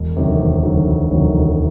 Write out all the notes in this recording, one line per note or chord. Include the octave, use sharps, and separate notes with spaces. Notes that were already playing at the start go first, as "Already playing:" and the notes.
Already playing: E1
D2 C3 D#3 F#3
E1
D2 C3 D#3 F#3
E1
D2 C3 D#3 F#3
E1